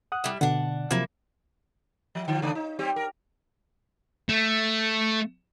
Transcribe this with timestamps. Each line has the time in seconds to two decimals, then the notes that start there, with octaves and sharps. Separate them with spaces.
0.12 F#5 D#6 F#6
0.24 G3 E4
0.41 B2 D3 D4 F#5
0.91 C3 F3 F#3 A#3 E4
2.15 F3
2.28 D3 F3
2.42 C#3 A3 D4
2.55 D#4
2.79 G3 C4 G4
2.96 A#4
4.29 A3